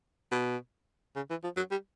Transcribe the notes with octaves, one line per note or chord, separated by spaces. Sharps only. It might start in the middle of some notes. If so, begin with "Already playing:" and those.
B2
C#3
E3
F3
F#3
G3